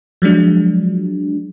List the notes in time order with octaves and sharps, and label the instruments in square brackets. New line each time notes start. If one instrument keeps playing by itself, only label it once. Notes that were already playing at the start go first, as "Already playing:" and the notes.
[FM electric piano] F3 F#3 G#3 D4